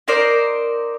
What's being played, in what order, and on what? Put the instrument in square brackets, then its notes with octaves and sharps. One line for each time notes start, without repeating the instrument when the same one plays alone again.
[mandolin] D#4 A#4 C5 D5